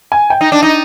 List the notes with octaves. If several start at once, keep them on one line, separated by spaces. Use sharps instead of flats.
G#5
G5
D#4
D4
D#4